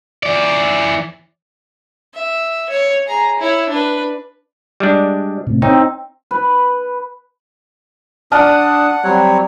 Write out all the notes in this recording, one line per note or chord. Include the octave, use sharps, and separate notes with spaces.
E3 D5
E5
C#5
G#4 A#5
E4 C#5
D4 B4
G3 G#3 D4
A2 C3
C4 D#4 C#5
B4
D4 D5 F#5 A5 D#6 F6
F#3 G3 C4 C#5